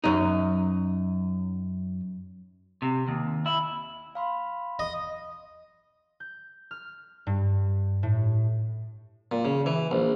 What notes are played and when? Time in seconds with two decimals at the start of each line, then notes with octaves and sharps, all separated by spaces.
0.04 F#2 D#4
2.82 C3
3.08 D#2
3.46 E4
4.15 F5 B5 C6
4.79 D#5
6.20 G6
6.71 F6
7.27 G2
8.03 A2
9.32 A#2
9.45 C#3
9.66 E3
9.91 A#1